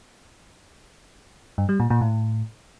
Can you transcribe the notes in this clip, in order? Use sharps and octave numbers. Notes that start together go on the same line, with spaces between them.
G2
G3
A#2
A#2
A2